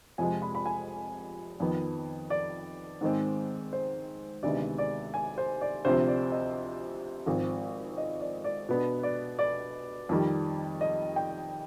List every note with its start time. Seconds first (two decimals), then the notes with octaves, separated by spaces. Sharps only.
0.18 F2 C3 F3 G#3 G#5
0.42 B5
0.55 B5
0.66 G#5
1.60 F2 D#3 B3
2.30 D5
3.01 G#2 D#3 G#3 C4
3.73 C5
4.43 D2 C3 D#3 G#3 B3 D5
4.78 D5
5.14 G#5
5.38 C5
5.61 D5
5.85 D2 C3 F3 C4 C5
6.08 D5
6.32 D#5
7.26 G#1 G#2 F3 C4
7.97 D#5
8.21 D5
8.44 D5
8.69 B2 B3 D4
9.03 D5
9.39 D5
10.09 F2 D#3 G3
10.81 D#5
11.16 G5